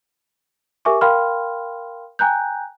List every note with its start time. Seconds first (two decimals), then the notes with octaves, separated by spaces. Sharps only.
0.85 G4 A#4 E5 G#5 C#6 D6
1.01 A#4 F5 G5 B5 C6 F6
2.19 G5 G#5 A#5 F#6 G6